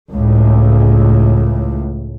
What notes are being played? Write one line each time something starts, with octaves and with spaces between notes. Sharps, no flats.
C#2 A2